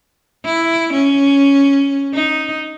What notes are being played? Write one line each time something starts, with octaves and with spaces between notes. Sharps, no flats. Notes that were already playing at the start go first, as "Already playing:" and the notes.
E4
C#4
D#4